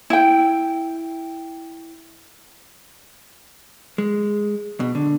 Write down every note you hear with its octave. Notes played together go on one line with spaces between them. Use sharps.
E4 G5
G#3
B2
D3